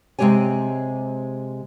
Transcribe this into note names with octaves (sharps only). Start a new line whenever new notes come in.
C3 D#3 G#3 G4 C#5 G#5